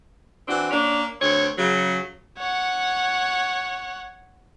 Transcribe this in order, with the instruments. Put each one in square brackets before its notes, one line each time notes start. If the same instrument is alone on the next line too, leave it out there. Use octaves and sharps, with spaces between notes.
[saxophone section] E3 C4 D4 F#4
A#3 C#4 D4
D2 C4 C#5
C#3 F#3
[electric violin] C#5 F#5